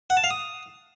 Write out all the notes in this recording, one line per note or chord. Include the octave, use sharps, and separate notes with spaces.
F#5
A5
F5
D#6